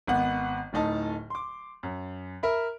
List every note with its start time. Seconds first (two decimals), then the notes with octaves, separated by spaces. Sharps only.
0.07 G#1 B3 F#5
0.73 D1 A2 D#4 A5
1.30 C6 D6
1.83 F#2
2.43 A#4 E5 B5